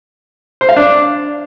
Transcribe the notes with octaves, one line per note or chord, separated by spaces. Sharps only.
C5
F5
D4